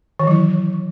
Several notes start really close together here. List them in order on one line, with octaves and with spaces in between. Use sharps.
D#3 E3 F#3 E4